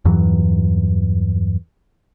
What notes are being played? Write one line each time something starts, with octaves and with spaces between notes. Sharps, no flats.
E2 G2 E3 F#3